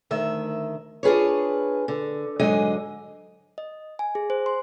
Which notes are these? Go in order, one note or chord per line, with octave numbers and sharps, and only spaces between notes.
D2 D#3 E5
D4 F4 G#4 B4 C#5
D3
G#2 D3 F#3 G#3 D#5 G#5
D#5
G#5
G#4
C5
C6